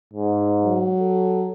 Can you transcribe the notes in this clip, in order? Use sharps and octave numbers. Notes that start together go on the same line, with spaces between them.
G#2
F#3
A4